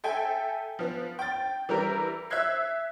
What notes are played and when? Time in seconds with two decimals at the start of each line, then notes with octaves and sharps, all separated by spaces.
0.04 A4 E5 G5 G#5
0.79 F3 B3
1.19 G5 A6
1.69 E3 G3 G4 A#4
2.30 E5 E6 F#6 G#6 C7